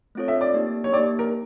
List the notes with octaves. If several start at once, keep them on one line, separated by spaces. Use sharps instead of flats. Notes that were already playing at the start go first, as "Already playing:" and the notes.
A3 C4 F4 A4 C#5
E5
D5
A#3 D#4 G4
C#5
A#3 D#4 G4 D5
A#4